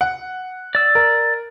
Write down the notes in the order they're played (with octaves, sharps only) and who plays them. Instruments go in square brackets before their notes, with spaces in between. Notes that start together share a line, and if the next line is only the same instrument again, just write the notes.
[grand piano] F#5
[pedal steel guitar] D5 E6
[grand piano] A#4